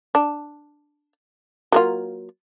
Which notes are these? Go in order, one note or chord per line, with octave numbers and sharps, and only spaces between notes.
D4
F#3 A#3 F4